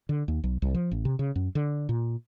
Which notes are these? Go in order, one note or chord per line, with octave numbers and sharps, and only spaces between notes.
D3
D#2
B1
C2
F3
A1
C3
C#3
F#2
D3
A#2